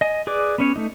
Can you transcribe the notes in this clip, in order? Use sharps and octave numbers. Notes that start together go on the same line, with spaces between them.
D#5 G#5
G#4 B4 D5 D6
B3 C#4 C#5
A3 D#4